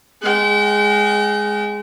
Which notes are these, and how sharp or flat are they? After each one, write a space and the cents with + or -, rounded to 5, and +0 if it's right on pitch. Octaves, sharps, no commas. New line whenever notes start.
G#3 +0 G5 -40